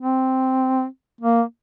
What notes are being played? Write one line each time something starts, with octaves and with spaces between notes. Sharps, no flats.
C4
A#3